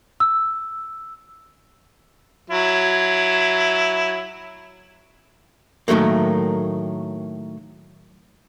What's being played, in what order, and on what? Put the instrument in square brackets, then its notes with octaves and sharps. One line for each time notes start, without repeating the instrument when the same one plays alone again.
[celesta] E6
[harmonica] F#3 E4
[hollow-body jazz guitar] A2 D#3 F#3 A3 A#3